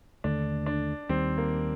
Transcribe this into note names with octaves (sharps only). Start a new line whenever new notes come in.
D#2 D3 A3 D4
D4
D#2 D#3 G3 C4
A#3